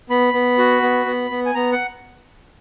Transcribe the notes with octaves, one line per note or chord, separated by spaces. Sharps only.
B3 B5
B3
F#4
B3
B3
B3
G#5
B3 A#5
F#5